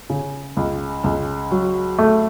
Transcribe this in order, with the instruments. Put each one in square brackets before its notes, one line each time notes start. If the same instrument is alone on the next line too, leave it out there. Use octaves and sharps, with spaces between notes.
[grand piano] C#3
C#2
C#2
F#3
A3